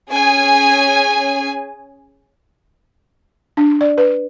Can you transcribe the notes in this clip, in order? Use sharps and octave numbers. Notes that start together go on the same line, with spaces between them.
C#4 G#4 G#5
D4
D5
B4